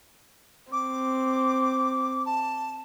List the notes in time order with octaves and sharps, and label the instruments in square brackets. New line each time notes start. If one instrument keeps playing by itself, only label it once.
[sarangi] C4 [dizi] D6
[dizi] A5